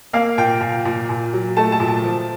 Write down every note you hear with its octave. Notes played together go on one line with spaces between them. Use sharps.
A#3 F5
A#2 G5
A#2
A#2
A#2
F#3
A3 A5
A5
A#2
A5
F3